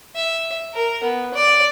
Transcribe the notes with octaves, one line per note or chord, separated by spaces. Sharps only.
E5
A#4
B3
D5